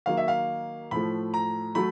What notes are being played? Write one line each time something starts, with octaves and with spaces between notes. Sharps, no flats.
D#3 F#3 A#3 F5
E5
F5
A2 F3 A3 B5
A#5
F#3 A3 B5